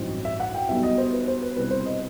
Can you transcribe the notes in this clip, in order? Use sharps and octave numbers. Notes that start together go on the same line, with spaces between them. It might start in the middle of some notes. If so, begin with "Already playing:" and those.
Already playing: A1 G2 F#3 C4 D#4
E5
F#5
G5
B1 B2 G3 B3 D#4 E5
D#5
C5
B4
C5
B4
C2 B2 G3 C4 B4
C5
D#5